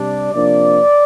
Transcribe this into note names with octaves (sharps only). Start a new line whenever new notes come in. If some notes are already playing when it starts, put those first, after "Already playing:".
Already playing: C3 G3 D4 D5
C3 F3 A#3 D4 D5